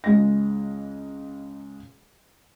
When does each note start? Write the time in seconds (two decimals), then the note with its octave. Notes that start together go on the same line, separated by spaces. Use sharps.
0.04 C#2 G#3 D#5 A#6